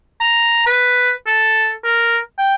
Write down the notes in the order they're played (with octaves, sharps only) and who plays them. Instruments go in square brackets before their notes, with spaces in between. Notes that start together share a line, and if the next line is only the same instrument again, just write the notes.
[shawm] A#5
B4
A4
A#4
G5